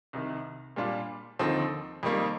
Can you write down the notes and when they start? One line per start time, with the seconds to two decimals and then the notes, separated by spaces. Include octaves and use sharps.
0.13 C2 C3 D#3
0.76 A#2 G3 D4 F4
1.39 D#2 D3 F3 C4 D#4
2.03 F2 D#3 G3 A#3